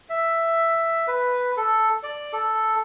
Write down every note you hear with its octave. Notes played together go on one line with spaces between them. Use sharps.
E5
B4
A4
D5
A4